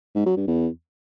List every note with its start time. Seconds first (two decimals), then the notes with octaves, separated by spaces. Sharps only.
0.15 G#2
0.26 F#3
0.37 G2
0.48 E2